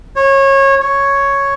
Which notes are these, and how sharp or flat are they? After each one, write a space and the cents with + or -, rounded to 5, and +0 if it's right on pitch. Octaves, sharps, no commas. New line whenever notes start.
C#5 -25
C#5 +0